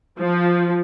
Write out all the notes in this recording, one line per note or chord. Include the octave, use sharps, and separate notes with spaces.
F3